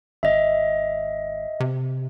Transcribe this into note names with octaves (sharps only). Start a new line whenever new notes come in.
G#1 D#5 E5
C3